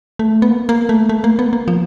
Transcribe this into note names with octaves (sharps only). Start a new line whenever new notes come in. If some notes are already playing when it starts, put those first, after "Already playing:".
A3
B3
A#3
A#3
A3
A3
A#3
B3
A#3
F3